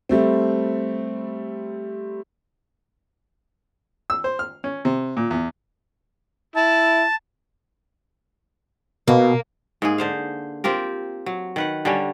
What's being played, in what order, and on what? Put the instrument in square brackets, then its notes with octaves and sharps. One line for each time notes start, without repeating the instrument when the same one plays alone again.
[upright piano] G3 A3 C4
[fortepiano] E6
C5
F6
C#4
C3
A#2
E2
[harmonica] E4 [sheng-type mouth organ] A5
[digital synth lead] B2 [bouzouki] A#3
[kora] G#2 A#3 G#4
D3 C5 F5
C4 F4 G4 A#4
F#3
D#3 B4 F#5
D3 G3 C#4